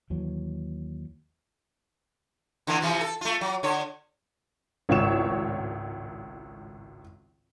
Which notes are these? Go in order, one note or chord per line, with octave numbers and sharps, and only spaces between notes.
D#2 E3 F#3
D3 E3 A#3
C3 E3 F3
A4
A3 F4
F#3
D3 C#5
G#1 C#2 A2 C#5 C#6 E7